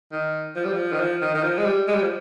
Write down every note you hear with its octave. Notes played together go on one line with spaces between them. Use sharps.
D#3
F3
G3
F3
D#3
F3
D#3
D#3
F3
G#3
G3
G#3
G3
F3